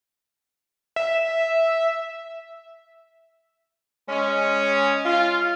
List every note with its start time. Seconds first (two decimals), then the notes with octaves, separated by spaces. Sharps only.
0.96 E5
4.09 G#3 C#4
5.06 F4